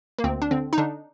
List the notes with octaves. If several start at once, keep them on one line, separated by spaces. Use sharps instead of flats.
A#3
D2 C4
D4
D3 C4
D#4
D3 D4